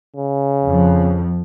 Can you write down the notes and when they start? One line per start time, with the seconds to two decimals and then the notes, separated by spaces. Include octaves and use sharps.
0.17 C#3
0.65 F2 F3